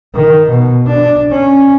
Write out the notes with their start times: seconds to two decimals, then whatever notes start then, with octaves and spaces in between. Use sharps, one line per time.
0.15 D#3
0.49 B2
0.86 D4
1.31 C#4